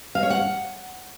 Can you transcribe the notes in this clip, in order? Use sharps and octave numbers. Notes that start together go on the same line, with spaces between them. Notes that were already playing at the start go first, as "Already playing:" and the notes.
F5
C#5
F#5